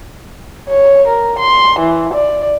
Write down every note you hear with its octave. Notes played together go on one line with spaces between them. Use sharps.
C#5
A#4
C6
E3
D5